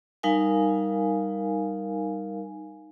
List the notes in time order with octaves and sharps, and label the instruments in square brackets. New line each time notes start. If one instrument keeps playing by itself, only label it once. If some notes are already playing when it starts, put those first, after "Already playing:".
[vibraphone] G3 D#4 A#4 F5 G#5